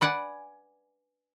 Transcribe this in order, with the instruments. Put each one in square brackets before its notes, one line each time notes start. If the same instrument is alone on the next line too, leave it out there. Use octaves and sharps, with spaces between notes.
[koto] B4 D5 F#5 G#5